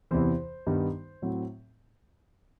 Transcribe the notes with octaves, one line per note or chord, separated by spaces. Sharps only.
E2 C3 E3 C5
G2 D#3 G3 B3 D#4
A2 F#3 C4